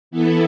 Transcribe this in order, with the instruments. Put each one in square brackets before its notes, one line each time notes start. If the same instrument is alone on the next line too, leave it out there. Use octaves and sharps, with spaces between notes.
[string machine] E3 B3 E4 A4